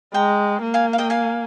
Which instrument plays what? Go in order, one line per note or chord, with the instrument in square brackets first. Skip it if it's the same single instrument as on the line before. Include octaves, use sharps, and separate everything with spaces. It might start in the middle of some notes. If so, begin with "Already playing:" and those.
[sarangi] G#3 [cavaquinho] G5 A#5
[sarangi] A#3
[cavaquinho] F5 G#5
F5
D#5 G5
F5 G#5